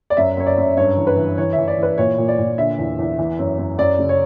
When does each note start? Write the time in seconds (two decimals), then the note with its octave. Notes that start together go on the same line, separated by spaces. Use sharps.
0.10 D5
0.17 F#2 E5
0.37 F#2 C#5
0.46 D5
0.57 F#2
0.77 G2 C#5
0.97 E3
1.07 B4
1.17 E3
1.38 E3 C#5
1.53 E5
1.58 E3
1.68 D5
1.78 E3
1.83 B4
1.98 A#2 C#5
2.18 A#2
2.28 D5
2.38 A#2
2.58 D3 E5
2.78 E2
2.99 E2
3.19 E3
3.39 F#2
3.58 F#2
3.78 F#2 D5
3.99 C#3
4.09 C#5